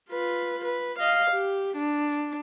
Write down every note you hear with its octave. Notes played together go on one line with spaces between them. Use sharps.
F4 B4
B4
D#5 F5
G4
D4